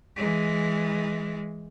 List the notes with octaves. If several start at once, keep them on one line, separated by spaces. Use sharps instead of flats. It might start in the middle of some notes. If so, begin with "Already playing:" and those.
E3 G#3